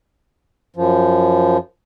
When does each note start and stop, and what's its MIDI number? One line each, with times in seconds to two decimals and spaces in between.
0.76 1.58 42
0.76 1.58 53